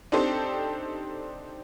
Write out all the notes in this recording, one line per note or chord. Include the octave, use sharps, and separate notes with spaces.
C4 D4 D#4 G4 A4 C5